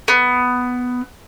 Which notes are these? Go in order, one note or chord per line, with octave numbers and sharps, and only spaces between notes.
B3